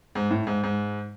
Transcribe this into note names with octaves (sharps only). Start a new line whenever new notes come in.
G#2
A2
G#2
G#2